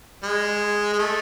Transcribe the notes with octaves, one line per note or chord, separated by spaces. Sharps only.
G#3
G#3
A3